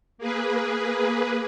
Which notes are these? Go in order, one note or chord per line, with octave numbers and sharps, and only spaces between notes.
A#3 G#4 B4